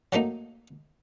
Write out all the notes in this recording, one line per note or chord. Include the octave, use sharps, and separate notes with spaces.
F#3 A3 A#3 D#4